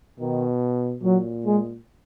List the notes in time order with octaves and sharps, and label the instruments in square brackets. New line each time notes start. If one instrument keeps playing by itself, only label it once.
[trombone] B2 [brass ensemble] D#3
[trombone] A#2 [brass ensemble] F#3
[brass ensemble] G#3